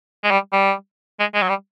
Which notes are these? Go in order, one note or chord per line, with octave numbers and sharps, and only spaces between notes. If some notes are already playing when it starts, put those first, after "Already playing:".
G#3
G3
G3
G#3
G#3
F#3
G3